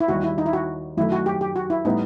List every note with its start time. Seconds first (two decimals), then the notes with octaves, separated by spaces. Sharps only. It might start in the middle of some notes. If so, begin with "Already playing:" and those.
0.01 E4
0.08 D#2 D#3 G3 F#4
0.23 E4
0.38 D#4
0.46 E4
0.53 F#4
0.97 F#2 D#3 F#3 A3 E4
1.12 F#4
1.26 G4
1.41 G4
1.56 F#4
1.70 E4
1.85 A2 G3 B3 D#4 E4